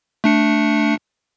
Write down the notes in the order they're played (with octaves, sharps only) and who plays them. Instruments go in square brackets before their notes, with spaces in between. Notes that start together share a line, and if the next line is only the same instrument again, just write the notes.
[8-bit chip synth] A3 D4 C#7